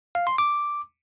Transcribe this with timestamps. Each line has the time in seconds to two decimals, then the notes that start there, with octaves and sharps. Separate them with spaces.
0.15 F5
0.27 C6
0.38 D6